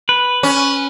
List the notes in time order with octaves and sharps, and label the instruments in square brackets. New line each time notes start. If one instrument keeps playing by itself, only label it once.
[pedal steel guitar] B4
[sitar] C#4